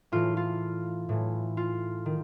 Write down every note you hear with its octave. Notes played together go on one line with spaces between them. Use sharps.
A2 E3 F4
F4
A2 E3
F4
D#3